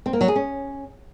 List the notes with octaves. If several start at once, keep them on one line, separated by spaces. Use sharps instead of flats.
C4
A#3
F#3
G#4
C#4